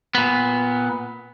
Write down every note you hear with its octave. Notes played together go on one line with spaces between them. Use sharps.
A#2 B3